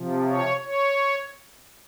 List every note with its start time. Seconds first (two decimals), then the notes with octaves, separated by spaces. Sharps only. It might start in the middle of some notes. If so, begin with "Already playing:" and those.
Already playing: C3 F3
0.27 C#5
0.64 C#5